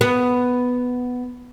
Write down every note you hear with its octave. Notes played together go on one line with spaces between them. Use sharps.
B3